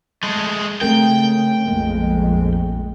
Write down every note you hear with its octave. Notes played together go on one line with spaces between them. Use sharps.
G#3 A3
C#3 A3 C4 A#4 G5
A#1 F2 G#3 A#3